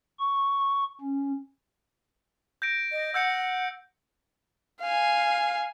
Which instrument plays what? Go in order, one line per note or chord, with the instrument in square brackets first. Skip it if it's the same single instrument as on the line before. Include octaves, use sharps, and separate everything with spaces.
[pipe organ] C#6
C#4
[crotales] G6 A#6 D7
[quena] D#5
[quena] F#5 [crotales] E6 G6 C#7
[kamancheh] F5 G#5